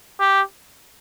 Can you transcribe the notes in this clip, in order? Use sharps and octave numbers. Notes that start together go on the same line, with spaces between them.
G4